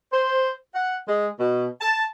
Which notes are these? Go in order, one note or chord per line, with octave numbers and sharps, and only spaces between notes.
C5
F#5
G#3
B2
A5